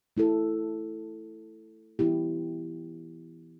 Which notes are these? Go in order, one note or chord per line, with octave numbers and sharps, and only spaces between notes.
A3 E4 A4
E3 B3 E4 G4